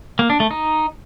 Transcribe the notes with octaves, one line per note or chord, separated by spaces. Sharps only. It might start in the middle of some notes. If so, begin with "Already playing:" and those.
A#3
D4
A3
D#4